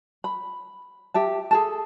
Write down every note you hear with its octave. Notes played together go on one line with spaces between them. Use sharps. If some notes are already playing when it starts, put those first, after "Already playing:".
B5
G4 E5 A5
G#4 A4 A5